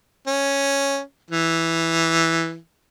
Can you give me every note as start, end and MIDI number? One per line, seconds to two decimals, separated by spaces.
0.27 1.00 61
1.31 2.56 52